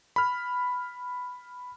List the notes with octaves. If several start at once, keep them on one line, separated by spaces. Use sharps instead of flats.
B5 F6